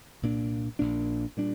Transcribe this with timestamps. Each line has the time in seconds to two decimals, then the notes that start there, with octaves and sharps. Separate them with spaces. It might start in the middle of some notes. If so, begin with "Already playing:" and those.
0.22 C2 A#2 A#3 D4
0.79 A#1 A#2 A#3 D4
1.37 A#2 G3 D4